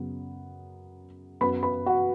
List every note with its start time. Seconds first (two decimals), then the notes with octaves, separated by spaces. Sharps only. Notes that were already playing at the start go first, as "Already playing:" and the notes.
Already playing: F#2 C#3 F#3 B3
1.41 F#2 F#3 B3 B4 B5
1.63 B4 B5
1.86 F#4 F#5